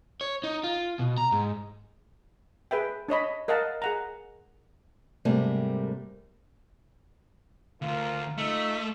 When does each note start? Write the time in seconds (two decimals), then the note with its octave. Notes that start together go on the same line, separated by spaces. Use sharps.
0.21 C#5
0.44 D#4
0.64 F4
0.99 B2
1.18 A#5
1.32 G#2
2.71 G#4 B4 E5 G5
3.09 D4 C#5 D#5 B5
3.48 A#4 D#5 F5 F#5 A5
3.82 G#4 F#5 A#5
5.25 G#2 C3 G3 A3 A#3
7.82 D2 F4 A#4
8.38 A3 D#4 F4 E5